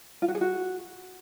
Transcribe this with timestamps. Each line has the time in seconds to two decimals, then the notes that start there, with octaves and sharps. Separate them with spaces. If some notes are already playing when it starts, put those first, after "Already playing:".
0.22 F4
0.28 F#4
0.35 G#4
0.41 F#4